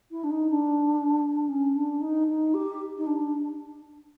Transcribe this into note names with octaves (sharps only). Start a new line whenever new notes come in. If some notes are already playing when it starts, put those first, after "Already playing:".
E4
D4
D#4
D4
C#4
D4
D#4
D#4
G4
D#4
D4